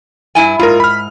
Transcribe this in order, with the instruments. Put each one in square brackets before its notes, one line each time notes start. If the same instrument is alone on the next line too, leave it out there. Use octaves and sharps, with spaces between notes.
[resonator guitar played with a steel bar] G2 E4 G#5
[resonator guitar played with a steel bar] G#2 [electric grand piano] F4 A#4
[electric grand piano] B5 F6